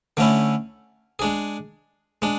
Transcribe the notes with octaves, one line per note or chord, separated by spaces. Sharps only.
D3 A3 C#4 E4
G#3 D4 G#4
G#3 D4